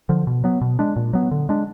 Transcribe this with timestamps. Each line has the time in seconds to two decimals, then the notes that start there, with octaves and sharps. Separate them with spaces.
0.09 D3 F3
0.27 B2
0.44 F#3 B3
0.61 B2
0.79 G#3 D4
0.96 A#2
1.13 F#3 B3
1.31 D3
1.49 G#3 D4